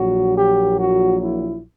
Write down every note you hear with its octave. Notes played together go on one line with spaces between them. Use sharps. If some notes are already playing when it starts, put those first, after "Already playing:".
Already playing: A#1 A#2 F#3 F#4
G4
F#4
E4